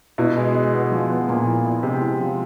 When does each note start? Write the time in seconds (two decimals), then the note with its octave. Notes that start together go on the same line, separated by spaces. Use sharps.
0.18 B2 E4
0.37 G#3
0.55 G#3
0.74 B3
0.92 F3
1.10 B3
1.28 A#2 F3
1.47 E4
1.65 E4
1.83 C3 G#3
2.01 E4
2.20 F3